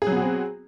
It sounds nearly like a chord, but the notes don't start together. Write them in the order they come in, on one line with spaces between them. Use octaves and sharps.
G#4 F#3 B3 F#4 C4